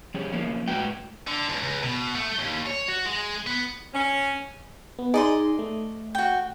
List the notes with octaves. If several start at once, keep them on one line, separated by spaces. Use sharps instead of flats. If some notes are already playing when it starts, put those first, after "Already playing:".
F3 G3 C#4 G#4
F3 A#3 C#4
A2 G#3 F#4 B4 G5
D3
C#2
C#2
B2
A3
D#2
C#5
F#4
G#3
B3
C#4
B3
D#4 G#4 D5 D#5 C6
A3
F#4 G5